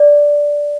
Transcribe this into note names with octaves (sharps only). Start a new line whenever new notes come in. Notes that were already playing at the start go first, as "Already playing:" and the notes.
Already playing: D5